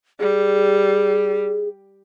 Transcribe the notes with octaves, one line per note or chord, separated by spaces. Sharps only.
G3 G#4